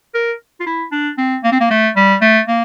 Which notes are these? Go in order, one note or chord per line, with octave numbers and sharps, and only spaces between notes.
A#4
F4
E4
D4
C4
A#3
C4
A#3
A3
G3
A3
A#3